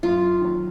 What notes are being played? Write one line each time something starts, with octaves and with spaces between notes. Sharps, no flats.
F#2 F4
D#3 F#3